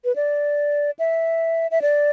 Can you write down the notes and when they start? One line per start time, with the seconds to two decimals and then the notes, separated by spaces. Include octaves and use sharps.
0.05 B4
0.16 D5
0.99 E5
1.71 E5
1.82 D5